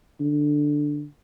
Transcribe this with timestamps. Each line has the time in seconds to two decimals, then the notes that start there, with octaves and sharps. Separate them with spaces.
0.20 D3